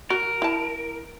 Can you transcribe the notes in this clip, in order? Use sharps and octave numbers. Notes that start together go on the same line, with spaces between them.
F#4 A#4
E4 A5